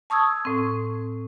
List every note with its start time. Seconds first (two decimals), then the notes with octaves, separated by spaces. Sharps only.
0.10 A5 C#6 D#6 E6 G#6
0.45 A2 C4